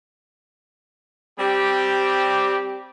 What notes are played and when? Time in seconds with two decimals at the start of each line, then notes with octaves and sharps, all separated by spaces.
1.40 G3 C4 G4